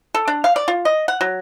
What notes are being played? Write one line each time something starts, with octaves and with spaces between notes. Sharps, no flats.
A4
D4
F5
D5
F4
D#5
F#5
F#3